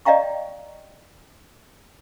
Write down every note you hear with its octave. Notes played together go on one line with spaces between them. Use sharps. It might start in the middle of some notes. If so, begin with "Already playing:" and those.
D5 D#5 F5 G5 A#5 C#6